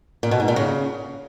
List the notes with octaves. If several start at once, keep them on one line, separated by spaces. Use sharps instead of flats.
A#2
B2
G#2
A#2
C#3